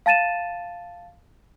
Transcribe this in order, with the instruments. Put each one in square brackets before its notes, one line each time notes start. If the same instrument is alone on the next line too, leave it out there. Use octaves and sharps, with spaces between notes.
[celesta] F5 A5 A6 D#7 E7